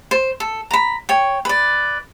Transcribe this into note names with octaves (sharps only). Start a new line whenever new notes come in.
C5
A4
A#5 B5
C#5 G5
B4 D5